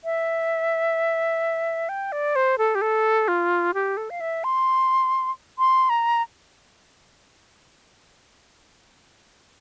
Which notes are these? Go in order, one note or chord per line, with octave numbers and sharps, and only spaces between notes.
E5
G5
D5
C5
A4
G4
A4
F4
G4
A4
F5
E5
C6
C6
A#5